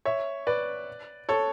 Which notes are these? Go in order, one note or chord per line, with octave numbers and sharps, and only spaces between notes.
C#5 E5
B4 D5
A4 C#5